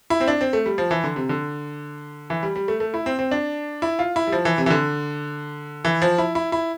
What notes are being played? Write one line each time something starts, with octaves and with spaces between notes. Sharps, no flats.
E4
C4
D4
C4
A3
G3
F3
E3
D3
C3
D3
E3
G3
G3
A3
A3
E4
C4
C4
D4
E4
F4
E4
G3
F3
E3
C3
E3
D3
E3
F3
E4
E4
E4